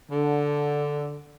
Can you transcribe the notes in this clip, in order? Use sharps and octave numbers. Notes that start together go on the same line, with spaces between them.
D3